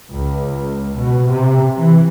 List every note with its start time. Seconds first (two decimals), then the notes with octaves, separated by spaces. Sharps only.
0.12 C#2
0.97 B2
1.29 C3
1.77 E3